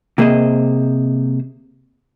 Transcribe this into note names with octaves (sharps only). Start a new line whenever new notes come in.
C3 A#3 G#4 C5 D#5